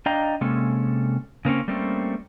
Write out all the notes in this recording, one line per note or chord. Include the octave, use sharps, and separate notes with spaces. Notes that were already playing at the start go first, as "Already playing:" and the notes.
D4 D#5 F5 G5 A#5
C3 G#3 A#3 C#4 A4
C#3 A#3 C4 C#4
G3 A3 A#3 C4 C#4